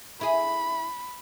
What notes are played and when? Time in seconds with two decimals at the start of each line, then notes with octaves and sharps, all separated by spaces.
0.21 E4 G#4 B5